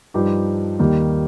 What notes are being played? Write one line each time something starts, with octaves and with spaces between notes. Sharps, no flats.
G2 F3 D#4 G4
D#2 D#3 G3 A#3 D#4